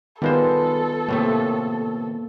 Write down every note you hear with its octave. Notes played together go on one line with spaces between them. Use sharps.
D#3 G3 G#3 B3 F4 A4 B4 C5
A2 C3 A3 A#3